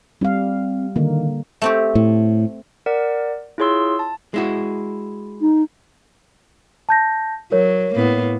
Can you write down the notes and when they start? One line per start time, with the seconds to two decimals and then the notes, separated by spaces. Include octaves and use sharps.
0.21 G3 C4 F5
0.96 D3 D#3 A#3
1.62 A3 C4 G4
1.95 A2
2.86 A#4 D5 F#5
3.58 E4 F4 G#4 C#5 C6 E6
3.99 A5
4.34 G#3 E4 F#4
5.41 D#4
6.89 A5 G6 A#6
7.52 F#3 A#4 C#5
7.95 A2 A#3 B3